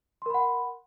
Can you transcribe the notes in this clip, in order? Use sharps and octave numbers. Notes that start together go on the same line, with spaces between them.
A#4 F#5 B5 C6